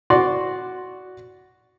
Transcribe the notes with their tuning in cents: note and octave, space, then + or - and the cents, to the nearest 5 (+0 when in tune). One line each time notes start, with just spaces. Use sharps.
F#4 +0 D5 -10 C6 +5